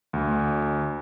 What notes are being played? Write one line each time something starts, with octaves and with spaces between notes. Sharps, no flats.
D2